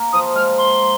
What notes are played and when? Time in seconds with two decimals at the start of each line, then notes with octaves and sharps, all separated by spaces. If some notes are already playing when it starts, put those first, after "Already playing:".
Already playing: A#3
0.12 F3 D#6
0.35 G#3 F6
0.57 C6